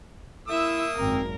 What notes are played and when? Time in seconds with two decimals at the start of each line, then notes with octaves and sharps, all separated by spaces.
0.48 A#3 E4 E5 D#6 E6
0.96 G#1 F#2 C4 A#4